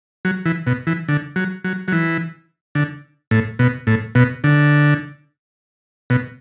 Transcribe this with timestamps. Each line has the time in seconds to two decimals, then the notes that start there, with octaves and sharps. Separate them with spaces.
0.25 F#3
0.46 E3
0.67 B2
0.87 E3
1.08 D3
1.36 F#3
1.64 F#3
1.88 F#3
1.92 E3
2.75 D3
3.31 A2
3.59 B2
3.87 A2
4.15 B2
4.44 D3
6.10 B2